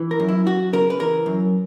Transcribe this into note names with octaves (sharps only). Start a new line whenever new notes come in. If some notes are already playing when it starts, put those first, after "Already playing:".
Already playing: E3
A#4
F#2
E4
F#2 F#4
C#3 A#4
B4
E3 A#4
F#2